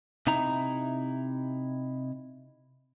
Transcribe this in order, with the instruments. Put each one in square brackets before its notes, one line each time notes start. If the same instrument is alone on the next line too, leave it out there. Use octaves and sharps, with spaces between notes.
[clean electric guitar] C3 D#4 E4 A#5